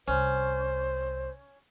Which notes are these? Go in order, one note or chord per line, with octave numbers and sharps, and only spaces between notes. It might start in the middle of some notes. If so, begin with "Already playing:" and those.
C2 C#4 C5